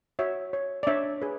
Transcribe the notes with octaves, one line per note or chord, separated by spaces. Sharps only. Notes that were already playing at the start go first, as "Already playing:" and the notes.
F#4 C#5 E5
C#5
D5
D4 C#5 E5
G#4 B4